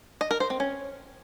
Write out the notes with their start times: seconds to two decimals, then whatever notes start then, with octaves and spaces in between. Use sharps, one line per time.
0.21 D#5
0.31 A#4
0.40 C5
0.50 C4
0.60 C#4